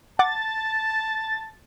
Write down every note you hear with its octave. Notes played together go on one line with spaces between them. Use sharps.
F#5 A5 D6 A6